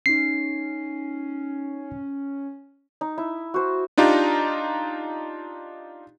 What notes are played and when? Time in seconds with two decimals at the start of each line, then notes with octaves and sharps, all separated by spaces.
0.06 C#4 D#4 C7
3.01 D#4
3.18 E4
3.54 F#4 C5
3.98 D4 D#4 F4 G4 A#5